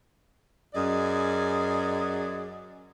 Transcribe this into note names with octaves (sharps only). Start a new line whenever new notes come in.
F#2 G#4 D5 D#5